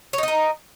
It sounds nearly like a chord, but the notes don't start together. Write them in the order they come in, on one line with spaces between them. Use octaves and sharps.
C#5 D#4 D#5 A#4